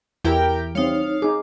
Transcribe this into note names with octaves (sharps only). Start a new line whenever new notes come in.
E2 E4 G4 A#4 G5
G3 C4 D#4 C#5 F5
D#4 G#4 D6